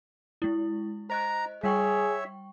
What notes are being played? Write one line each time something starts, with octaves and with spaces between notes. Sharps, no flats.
G#3 E4
C5 D#5 A#5 F#6
G3 G#4 C#5 E5 G5 C#6